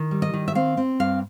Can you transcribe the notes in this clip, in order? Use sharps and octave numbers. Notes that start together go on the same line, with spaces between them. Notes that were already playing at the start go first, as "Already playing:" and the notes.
Already playing: D#3
G3
D#5
D#3
E5
C4 F5
C4
G2 F5